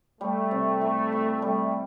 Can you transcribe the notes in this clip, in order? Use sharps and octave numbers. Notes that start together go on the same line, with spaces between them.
G3 A3
C3
E3
E3
G3 A3